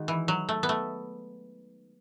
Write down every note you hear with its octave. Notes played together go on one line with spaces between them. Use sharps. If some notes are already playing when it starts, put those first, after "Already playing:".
Already playing: D#3 G#3 D#4 F#4
E3
F#3
A3
B3
A3